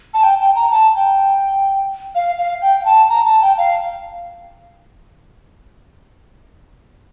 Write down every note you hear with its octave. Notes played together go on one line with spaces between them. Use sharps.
A5
G5
G5
A#5
A5
G5
F5
F5
G5
G5
A5
A#5
A5
G5
F5